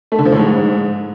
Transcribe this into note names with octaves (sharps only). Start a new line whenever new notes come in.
A3
D3
F3
A2
G#2